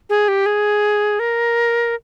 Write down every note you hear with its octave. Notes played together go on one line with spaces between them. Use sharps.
G#4
G4
G#4
A#4